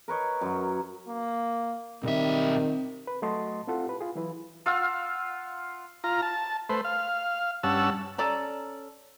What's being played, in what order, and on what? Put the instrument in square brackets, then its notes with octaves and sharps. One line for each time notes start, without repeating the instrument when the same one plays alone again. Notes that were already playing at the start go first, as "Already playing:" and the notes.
[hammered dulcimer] A#4 B4 C#5 D#5
F#2 F#3
[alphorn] A#3
[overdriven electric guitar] B1 E5 [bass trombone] D#3 [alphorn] G3 [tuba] C4
[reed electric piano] B4
F#3 A3 F#4 D#5 A5 C6
C4 E4 F4 A4 F#5
G4 B4
F4 G#4
E3 F#3 E4 B4
[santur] F4 F5 F#5 E6
[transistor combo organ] F4 A#5
A5
A3 B4 C5
F5
G2 C#4 F#5 A5 E6
[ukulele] C#4 A4 D5 A#5